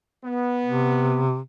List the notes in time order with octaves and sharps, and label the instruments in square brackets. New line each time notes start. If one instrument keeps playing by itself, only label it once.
[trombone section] B3
[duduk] C3